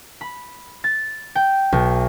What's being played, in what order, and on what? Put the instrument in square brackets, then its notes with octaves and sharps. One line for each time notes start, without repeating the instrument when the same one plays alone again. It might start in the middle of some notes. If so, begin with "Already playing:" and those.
[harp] B5
A6
G5
B1